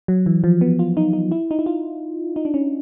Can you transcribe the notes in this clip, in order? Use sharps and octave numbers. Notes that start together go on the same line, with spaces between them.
F#3
E3
F3
B3
F4
D#4
D#4
E4
D#4
E4
F4
D#4
D4
C#4